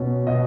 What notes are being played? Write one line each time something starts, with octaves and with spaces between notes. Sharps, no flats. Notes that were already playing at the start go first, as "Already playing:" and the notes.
Already playing: B2 C#4
B2 D#5